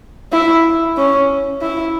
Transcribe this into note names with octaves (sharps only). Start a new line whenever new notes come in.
E4
C#4
E4